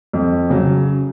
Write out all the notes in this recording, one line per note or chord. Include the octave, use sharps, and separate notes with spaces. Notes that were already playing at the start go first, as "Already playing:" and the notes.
F2
C#3 F#3